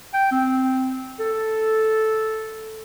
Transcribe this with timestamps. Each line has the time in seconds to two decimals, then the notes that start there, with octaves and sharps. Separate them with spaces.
0.14 G5
0.32 C4
1.20 A4